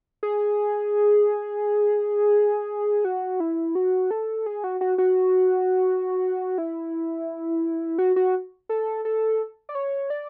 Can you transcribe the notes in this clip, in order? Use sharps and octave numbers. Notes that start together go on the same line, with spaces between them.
G#4
F#4
E4
F#4
A4
G#4
F#4
F#4
F#4
E4
F#4
F#4
A4
A4
D5
C#5
D5